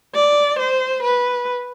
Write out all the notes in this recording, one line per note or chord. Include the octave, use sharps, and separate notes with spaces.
D5
C5
B4